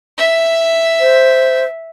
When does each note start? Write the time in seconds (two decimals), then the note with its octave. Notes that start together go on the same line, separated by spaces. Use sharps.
0.18 E5
1.00 C5